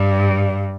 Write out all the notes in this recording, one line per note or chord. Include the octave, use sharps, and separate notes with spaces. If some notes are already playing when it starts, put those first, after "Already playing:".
Already playing: G2